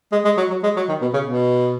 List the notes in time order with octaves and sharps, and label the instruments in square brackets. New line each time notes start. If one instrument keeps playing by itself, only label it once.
[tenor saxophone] G#3
G#3
F#3
F#3
G#3
F#3
D#3
B2
C#3
B2